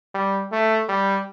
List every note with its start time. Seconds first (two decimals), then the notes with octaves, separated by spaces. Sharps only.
0.14 G3
0.52 A3
0.89 G3